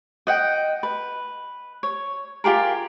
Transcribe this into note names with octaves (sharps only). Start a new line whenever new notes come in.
D#5 F#5 G5
B4
C#5
F4 G4 G#4 A#4